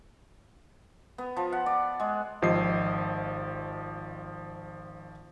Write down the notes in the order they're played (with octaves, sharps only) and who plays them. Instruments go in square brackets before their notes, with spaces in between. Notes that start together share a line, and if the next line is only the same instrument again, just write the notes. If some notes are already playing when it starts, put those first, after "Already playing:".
[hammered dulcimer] B3
F3
F#5
D5
G#3
[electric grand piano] G#1 F3 G4 D#5 C7